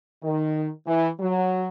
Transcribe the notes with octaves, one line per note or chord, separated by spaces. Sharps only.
D#3
E3
F#3